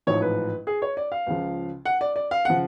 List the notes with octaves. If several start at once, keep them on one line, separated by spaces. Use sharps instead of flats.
A1 G#2 F3 C#5
B4
G#4
C#5
D5
F5
C#2 C#3 F3
F#5
D5
D5
F5
C#3 F3 F#5